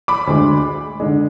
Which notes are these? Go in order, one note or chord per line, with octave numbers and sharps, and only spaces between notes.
B5 D6
D2 D3 G#3
D3 G#3